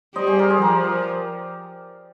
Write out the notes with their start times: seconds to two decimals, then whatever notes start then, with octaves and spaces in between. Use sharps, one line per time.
0.16 G3 C5 D#5
0.27 G#4 C5
0.39 A#4 D5
0.50 G#4 C5
0.61 F3 G4 A#4